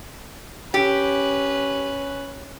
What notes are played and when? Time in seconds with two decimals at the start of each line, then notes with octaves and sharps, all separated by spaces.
0.74 C#4 G4 B4